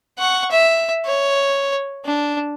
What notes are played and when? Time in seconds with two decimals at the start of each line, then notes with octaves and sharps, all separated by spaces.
0.19 F#5 C#6
0.51 E5
1.06 C#5
2.05 D4